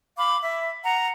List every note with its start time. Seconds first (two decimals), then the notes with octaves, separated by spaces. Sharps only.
0.17 F5 B5 D6
0.43 E5
0.84 F#5 A#5